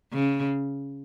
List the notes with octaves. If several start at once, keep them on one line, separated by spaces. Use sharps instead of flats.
C#3